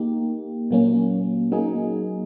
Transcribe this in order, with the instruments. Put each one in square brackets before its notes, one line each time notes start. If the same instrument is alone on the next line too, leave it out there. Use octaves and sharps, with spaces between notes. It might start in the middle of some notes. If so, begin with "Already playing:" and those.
Already playing: [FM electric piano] A#3 D#4 G4
A#2 F#3 A#3 C#4
F#3 A#3 D#4 G#4